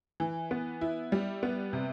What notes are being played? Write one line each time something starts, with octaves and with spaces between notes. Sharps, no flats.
E3
B3
E4
G3
B3
C3